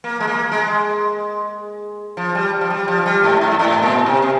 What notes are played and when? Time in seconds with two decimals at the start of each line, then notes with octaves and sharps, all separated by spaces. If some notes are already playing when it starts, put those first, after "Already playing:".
0.04 A#3
0.20 G#3
0.28 A#3
0.51 G#3
2.17 F3
2.35 G3
2.61 F3
2.70 G3
2.88 F3
3.06 G3
3.23 G#2
3.41 G#2
3.59 G#2
3.83 A#2
4.06 C3
4.22 C3